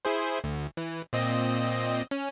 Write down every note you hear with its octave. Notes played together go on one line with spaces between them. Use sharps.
E4 G#4 C5
D2
E3
A#2 C4 D#5
C#4